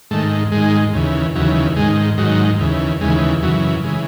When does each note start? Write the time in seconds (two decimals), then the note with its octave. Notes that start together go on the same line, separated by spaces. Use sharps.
0.11 G#2 D#3 A3
0.52 G#2 D#3 G#3
0.94 D#2 C#3 E3
1.35 D#2 C#3 E3 F#3
1.76 G#2 D#3 G#3
2.18 G#2 D#3 F#3
2.59 D#2 C#3 E3
3.00 D#2 C#3 E3 G#3
3.42 F#2 C#3 E3 F#3
3.84 C#3 E3 G#3